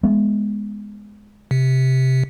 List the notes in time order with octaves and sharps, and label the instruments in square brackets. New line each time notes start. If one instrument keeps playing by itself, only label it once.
[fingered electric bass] G#3 B3
[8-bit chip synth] C3